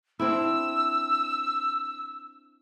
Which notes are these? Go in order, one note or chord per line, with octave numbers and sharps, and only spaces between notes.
C4 D4 E4 E6